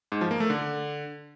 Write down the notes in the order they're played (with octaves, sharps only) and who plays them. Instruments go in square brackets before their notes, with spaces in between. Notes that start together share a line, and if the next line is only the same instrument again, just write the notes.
[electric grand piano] G#2
F3
A#3
A3
D3